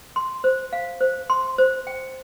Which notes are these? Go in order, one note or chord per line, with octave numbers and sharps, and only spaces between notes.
C6
C5
F5
C5
C6
C5
G5